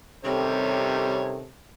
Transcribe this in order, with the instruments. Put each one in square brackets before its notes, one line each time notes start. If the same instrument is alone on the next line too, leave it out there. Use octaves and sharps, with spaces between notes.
[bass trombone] C3 [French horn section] D#3 C#4 A4 [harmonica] G3 C#5 [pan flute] C4